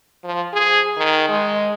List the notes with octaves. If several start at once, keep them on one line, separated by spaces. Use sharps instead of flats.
F3
G#4
D#3
G#3